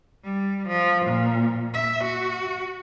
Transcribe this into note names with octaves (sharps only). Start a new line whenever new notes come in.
G3
F3
A#2
E5
F#4